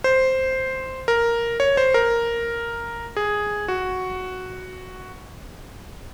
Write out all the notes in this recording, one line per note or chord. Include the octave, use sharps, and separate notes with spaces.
C5
A#4
C#5
C5
A#4
G#4
F#4